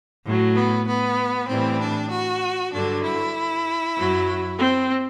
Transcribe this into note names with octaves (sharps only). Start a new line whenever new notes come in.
A2 F#3
B3
B3
A2 E3 G3 C4
D4
F#4
G2 D3 F#3 D4
E4
F#2 F#3
C4